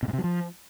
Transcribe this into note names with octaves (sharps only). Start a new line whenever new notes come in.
B2
G#2
C3
F#3
F3